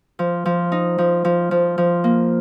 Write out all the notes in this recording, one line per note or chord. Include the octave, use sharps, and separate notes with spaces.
F3
F3
D#4
F3
F3
F3
F3
A#3